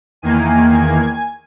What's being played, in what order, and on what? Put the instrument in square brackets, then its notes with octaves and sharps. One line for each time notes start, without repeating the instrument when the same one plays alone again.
[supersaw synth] E2 D#3 A#3 G#5
G#5